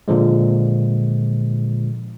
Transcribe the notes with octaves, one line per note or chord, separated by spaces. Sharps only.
A#2 D3 F3 G#3